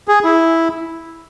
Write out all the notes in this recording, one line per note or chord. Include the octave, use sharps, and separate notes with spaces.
G#4
E4